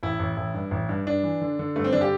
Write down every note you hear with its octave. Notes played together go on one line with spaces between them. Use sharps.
A1 E4
A1
A1
G2
A1
G2
G2 D4
E3
D3
D3
G2 A3
C4
D3 D4
G4